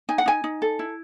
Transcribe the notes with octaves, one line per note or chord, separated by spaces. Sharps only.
D#4 G#5
F#5
D#4 G#5
D#4
A4
E4